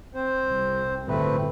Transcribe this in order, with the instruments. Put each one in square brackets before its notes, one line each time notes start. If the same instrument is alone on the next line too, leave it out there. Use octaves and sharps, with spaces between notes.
[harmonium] C4 C5
[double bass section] C2
[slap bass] D1 G1 [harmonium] A3 C4 B4